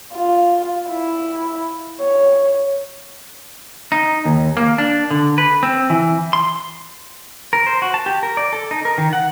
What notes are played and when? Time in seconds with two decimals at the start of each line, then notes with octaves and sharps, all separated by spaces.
0.14 F4
0.90 E4
2.01 C#5
3.92 D#4
4.25 D#2
4.57 A#3
4.78 D4
5.11 D3
5.38 B4
5.63 C4
5.90 E3
6.33 C6
7.53 A#4
7.67 C5
7.82 F#4
7.94 A5
8.06 G4
8.23 A#4
8.37 D5
8.53 A4
8.71 D#4
8.85 A#4
8.98 D#3
9.13 F#5